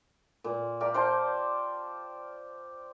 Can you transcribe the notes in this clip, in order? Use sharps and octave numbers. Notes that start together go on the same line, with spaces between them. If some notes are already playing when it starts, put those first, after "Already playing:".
A#2
G4 A#4 D5 F5
C5 G5 A5